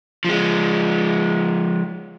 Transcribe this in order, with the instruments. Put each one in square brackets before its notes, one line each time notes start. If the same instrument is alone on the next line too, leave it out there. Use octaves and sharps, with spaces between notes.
[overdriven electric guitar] F3 G#3